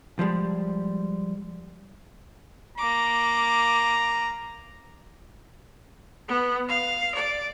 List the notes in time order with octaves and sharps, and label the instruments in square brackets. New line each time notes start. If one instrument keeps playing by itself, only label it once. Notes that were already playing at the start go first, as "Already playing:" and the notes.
[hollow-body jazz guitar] F3 G3 G#3
[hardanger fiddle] A#3 D6 [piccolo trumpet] A#5
[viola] B3
F5
D5